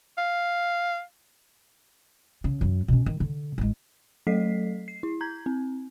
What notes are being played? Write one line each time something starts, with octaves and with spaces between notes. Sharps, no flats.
F5
C#3
F#2 F#3
B2 C#4
D#3
D3
A1 G#3
F#3 A3 A4 D#5 B6 C7
C7
E4
A#5 G6 G#6
C4